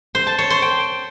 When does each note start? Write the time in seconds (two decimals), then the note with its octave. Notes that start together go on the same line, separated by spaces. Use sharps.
0.15 C5
0.27 A5
0.38 C#5
0.50 C5
0.62 G5